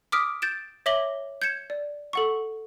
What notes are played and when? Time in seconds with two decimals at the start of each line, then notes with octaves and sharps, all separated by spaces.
0.12 D6 D#6 F6 B6 D7
0.42 G6 A6 D7 E7
0.86 C#5 E5 D6 A#6 F#7 G7
1.42 G6 G#6 C#7 E7
1.70 D5
2.13 A4 F#5 C#6